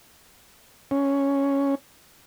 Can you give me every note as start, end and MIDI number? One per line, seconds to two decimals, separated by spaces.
0.91 1.75 61